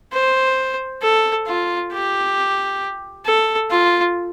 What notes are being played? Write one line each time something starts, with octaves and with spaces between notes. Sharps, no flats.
C5
A4
F4
G4
A4
F4